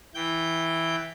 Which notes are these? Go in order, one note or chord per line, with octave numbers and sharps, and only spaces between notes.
E3 G5 G6